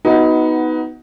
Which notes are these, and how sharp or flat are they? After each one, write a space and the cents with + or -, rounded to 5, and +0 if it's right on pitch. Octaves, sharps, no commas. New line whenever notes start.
B3 +5 D#4 +20 F#4 +0